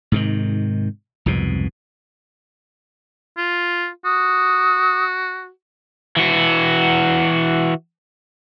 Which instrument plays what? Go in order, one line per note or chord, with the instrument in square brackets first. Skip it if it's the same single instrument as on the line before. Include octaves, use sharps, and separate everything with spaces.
[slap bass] G#2 C3 D#3
C2 F2 G#2 B2
[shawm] F4
[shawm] F#4 [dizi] D#6
[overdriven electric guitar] E3 F#4